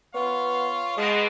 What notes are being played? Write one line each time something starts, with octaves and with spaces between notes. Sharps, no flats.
B3 F4 C#5 F5
B2 G#3 G#4 D#5